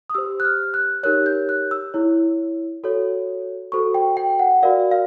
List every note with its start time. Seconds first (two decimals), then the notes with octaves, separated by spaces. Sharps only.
0.10 D#6
0.14 G4 C5 E6
0.40 F#6
0.45 F6
0.74 F#6
1.03 D#4 G4 A#4 C#5 F#6
1.26 G6
1.49 F#6
1.71 E6
1.94 E4 G#4 C#5
2.84 F#4 A4 C#5
3.72 F#4 A4 C5 C#6
3.94 G5
4.17 G5
4.39 F#5
4.63 F#4 A#4 D5 F5
4.91 F5